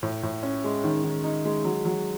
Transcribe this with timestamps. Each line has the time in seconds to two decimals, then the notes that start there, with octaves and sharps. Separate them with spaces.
0.03 A2
0.23 A2
0.43 C#4
0.64 G#3
0.84 D#3
1.04 D#3
1.24 D#4
1.45 G#3
1.65 F#3
1.85 F#3